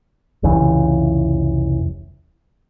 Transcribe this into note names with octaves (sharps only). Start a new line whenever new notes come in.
F1 C2 C#3 E3